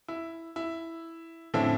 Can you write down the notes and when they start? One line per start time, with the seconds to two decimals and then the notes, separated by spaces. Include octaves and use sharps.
0.08 E4
0.56 E4
1.54 A2 D3 F3 C4 C#4 E4